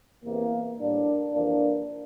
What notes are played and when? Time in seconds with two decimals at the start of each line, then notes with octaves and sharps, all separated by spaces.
0.23 E2 C3 E3 A#3
0.78 A2 G3 A#3 D4
1.32 F2 C3 E3 A#3 D4